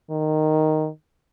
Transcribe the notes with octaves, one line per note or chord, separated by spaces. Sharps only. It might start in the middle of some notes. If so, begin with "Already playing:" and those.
D#3